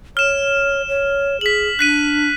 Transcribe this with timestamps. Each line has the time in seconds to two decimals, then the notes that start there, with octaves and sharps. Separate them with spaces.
0.17 C#5 F6 E7
0.88 C#5
1.41 G#4 B6 F#7
1.79 D4 F#6 B6 D#7